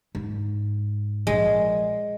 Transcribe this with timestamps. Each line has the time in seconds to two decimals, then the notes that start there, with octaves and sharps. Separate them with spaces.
0.15 G#2
1.27 A#1 G#3